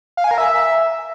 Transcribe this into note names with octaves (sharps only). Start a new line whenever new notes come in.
F5
G#5
A#4
E5